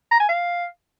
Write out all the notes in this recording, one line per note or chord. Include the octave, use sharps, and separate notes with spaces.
A#5
G#5
F5